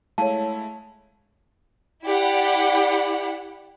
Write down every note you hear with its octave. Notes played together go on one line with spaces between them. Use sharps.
G#3 A3 E4 C#5 F5 A5
E4 G4 D5 F#5 B5